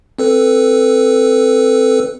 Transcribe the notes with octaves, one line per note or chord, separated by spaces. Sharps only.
C4 A4 B4